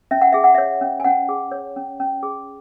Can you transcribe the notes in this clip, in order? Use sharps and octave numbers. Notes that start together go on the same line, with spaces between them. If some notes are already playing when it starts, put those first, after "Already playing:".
C#4 E5
F#5
G#4 E5
F#5
C#5 E5
C#4
G#5
C#4 F#5
G#4
C#5
C#4
C#4
G#4